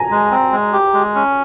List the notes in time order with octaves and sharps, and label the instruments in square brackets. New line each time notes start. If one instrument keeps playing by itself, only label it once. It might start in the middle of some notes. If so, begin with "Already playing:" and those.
Already playing: [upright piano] G#5 A#5
[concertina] G#3
C4
G#3
G4
G#3
C#4